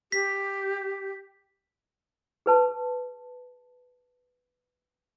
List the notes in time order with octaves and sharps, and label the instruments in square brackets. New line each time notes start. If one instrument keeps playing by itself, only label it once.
[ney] G4 [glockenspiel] B6
[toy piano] G#4 B4 A5